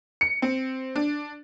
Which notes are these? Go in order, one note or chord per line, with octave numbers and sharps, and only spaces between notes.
C#7
C4
D4